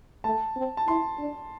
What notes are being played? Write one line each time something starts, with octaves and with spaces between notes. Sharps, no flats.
A3 A5
C4
A5
E4 C6
D4